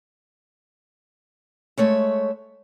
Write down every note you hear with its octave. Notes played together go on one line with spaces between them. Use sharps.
G#3 A3 C#5 E5